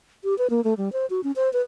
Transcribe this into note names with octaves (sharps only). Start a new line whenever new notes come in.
G4
B4
A#3
A3
G3
C5
F#4
C#4
C5
B4